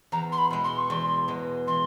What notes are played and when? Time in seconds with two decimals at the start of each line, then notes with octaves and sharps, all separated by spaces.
0.12 E2 A#5
0.32 C6
0.38 B5
0.50 B2 G#3
0.64 C6
0.78 C#6
0.90 E2 C6
1.28 B2 G#3
1.67 E3 C6